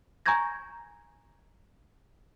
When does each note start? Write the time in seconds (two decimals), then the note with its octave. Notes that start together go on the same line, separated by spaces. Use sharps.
0.26 G#5 A#5 C#6 G6 G#6 A#6